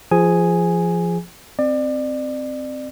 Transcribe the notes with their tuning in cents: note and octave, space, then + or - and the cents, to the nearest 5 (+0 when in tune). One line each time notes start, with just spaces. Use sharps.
F3 -15 G#4 +0 G#5 +0
C4 +0 D5 +30